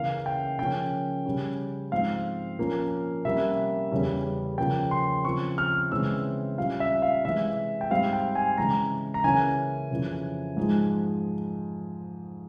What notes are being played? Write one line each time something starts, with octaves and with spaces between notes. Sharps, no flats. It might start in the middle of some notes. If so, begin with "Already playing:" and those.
Already playing: C#3 E3 A#3 C#4 F5
G5
C#3 F3 A#3 C#4 G5
C#3 G3 C#4
G#2 F3 C4 F5
A#2 F3 A#3 C#4
C3 G3 A#3 C#4 E5
E2 C#3 G3 C#4
C#3 F3 A#3 G5
C6
C#3 F3 C4 C#6
F6
C#3 E3 G#3 C4 E6
A#2 G3 C#4 F5
E5
F5
C3 E3 G#3 E5
G5
G#2 G3 C4 F5
G5
G#5
C#3 E3 G#3 A#5
A#5
C#3 E3 A#3 C#4 G#5
F2 C#3 E3
G#2 F3 G#3